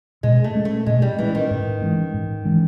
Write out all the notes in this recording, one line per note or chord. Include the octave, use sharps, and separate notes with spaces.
B2 G#3
A3
G#3 C#4
A3
B2 G#3
G3
E3 G#3 C#4
D#3
G#2
E3 G#3 C#4
G#2
E3 G#3 C#4